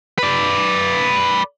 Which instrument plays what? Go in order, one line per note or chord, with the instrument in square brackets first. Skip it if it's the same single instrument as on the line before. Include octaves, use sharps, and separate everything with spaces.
[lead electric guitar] B4 D5